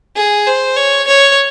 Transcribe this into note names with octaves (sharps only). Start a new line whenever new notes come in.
G#4
C5
C#5
C#5